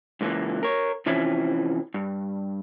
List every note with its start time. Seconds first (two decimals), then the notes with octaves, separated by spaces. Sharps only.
0.21 C#2 A#2 D#3 E3 A#3
0.63 A#4 C#5
1.06 C3 E3 F3 C#4 E4
1.94 G2